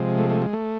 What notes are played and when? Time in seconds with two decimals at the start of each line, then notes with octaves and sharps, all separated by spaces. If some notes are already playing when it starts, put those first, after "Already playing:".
Already playing: C3 F3 G#3
0.18 A3
0.30 A3
0.42 G#3
0.53 A3